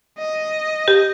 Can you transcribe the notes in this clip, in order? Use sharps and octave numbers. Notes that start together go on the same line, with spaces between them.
D#5
G4